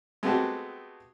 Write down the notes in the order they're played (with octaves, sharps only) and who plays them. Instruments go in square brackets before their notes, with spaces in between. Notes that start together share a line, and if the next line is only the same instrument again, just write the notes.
[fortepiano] G#3 A3 B3 C4 F#4 G4